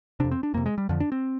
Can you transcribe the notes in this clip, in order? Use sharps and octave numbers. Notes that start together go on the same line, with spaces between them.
F2 C3 D4
C4
D4
F2 C3 A#3
G#3
G3
F2 D3 F3
D4
C4